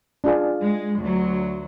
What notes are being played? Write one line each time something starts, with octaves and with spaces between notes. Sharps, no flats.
D4 F4 G#4
G#3
D2 F#3